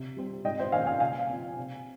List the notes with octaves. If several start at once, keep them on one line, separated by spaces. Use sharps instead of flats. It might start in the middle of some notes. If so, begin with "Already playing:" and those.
Already playing: C3
G3 C4
G#2 D#5 G5
C5 D#5
D#3 A#3 C#4 F5 G#5
F5 G#5
C#3 F5 G#5
F3 C4
C3